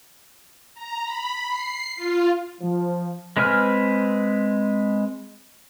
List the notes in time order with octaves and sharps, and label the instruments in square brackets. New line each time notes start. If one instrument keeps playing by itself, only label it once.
[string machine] A#5
B5
C7
F4
[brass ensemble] F3
[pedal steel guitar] G#3 C4 B4 G#5 F6